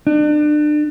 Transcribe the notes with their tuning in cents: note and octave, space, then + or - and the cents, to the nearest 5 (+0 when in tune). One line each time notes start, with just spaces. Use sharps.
D4 +35